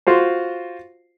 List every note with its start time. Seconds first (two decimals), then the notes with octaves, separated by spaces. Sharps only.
0.07 F4 F#4 C5